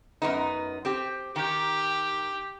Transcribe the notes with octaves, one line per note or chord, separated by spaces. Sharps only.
F#2 B3 D#4
C4 G4
D#3 G4